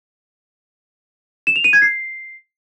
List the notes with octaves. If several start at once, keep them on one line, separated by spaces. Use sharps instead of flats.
E7
F7
D#7
G#6
C7